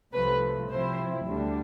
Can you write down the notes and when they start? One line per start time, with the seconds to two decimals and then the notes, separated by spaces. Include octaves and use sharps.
0.13 C2 C3 F3 A3 B4
0.70 C3 F3 C4 E4 C5
1.27 D2 D3 G3 D4